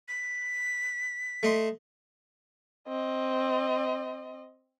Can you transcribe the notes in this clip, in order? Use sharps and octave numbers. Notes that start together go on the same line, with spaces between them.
B6
A3 D#5 C6
C4 D#5